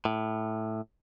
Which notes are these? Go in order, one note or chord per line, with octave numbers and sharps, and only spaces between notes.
A2